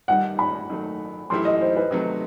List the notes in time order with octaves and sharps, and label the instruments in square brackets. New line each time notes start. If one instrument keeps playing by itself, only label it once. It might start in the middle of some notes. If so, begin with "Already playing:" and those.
[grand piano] G2 D#3 G3 [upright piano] F#5
[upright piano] B5
[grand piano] D#3 F#3 A3
[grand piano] F#2 E3 A3 E4 G4 [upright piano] C6
[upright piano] D#5
C5
B4
[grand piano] C3 D#3 F#3 A3